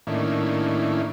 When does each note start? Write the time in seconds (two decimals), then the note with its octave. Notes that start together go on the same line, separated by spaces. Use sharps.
0.07 A2 D#3 A#3 C#4 D4 E4